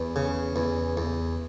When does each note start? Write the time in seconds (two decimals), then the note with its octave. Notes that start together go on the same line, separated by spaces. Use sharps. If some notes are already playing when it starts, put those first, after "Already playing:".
Already playing: E2
0.16 C#3
0.56 E2
0.97 E2